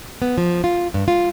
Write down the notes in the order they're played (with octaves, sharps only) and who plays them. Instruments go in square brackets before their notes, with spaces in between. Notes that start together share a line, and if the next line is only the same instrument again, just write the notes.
[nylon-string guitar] B3
F3
F4
G2
F4